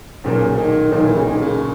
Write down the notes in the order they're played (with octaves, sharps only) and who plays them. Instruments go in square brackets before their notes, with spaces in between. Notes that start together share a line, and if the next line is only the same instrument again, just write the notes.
[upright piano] B1 A#2 A#3 [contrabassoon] C#3
[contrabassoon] D#3
[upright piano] B1 A#2 A#3 [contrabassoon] D#3
[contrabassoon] E3
C#3
D#3
C#3